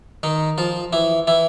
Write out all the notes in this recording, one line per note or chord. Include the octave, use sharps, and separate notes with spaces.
D#3 D#4
F3 F4
E3 E4
E3 E4